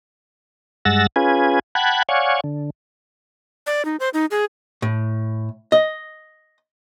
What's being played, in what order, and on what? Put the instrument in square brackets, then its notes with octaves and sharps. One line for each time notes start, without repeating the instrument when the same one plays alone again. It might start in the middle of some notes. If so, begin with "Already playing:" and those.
[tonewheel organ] G2 G#3 F#5 E6 A6 A#6
C#4 F4 G#4 B4 G#5
F#5 G5 A5 B5 F#6 G#6
C#5 D5 F5 F#5 G#5 C#6
D3
[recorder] D5
D#4
C5
D#4
G#4
[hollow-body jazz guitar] A2
D#5